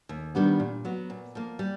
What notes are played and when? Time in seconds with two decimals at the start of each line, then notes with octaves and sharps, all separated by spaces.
0.09 D#2
0.35 D#3 G3 B3 D4
0.60 A#2
0.85 F#3 B3
1.10 A#2
1.35 F3 A#3
1.59 G3